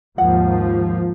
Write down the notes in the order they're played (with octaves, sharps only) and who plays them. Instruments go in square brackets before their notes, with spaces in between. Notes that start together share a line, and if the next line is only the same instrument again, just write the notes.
[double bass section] D#2 G#2 F3 [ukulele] F#5